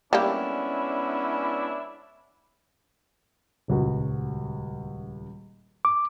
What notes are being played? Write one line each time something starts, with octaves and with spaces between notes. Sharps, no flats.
G3 G#3 A#3 B3 C#4 D4 E4 G4
D#1 C#2 F#4
D6